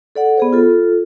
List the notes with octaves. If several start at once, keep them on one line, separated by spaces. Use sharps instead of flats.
A4 D5 F#5
B3 G#4 C5
F4 A4